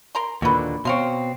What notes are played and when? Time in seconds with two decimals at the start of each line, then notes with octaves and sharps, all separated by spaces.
0.15 A#4 A#5 C6
0.42 D#2 A#2 D3 F#4 B4
0.85 B2 C4 C#5 F5 C6